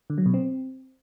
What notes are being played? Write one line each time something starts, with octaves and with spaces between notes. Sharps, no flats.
D3
F#3
B2
C4